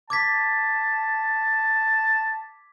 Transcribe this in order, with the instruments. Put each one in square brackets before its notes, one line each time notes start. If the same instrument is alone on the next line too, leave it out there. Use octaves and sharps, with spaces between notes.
[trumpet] A5 [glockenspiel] D6 G#6 B6